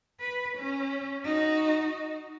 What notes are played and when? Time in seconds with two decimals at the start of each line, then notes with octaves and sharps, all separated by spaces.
0.20 B4
0.57 C#4
1.24 D#4 F#4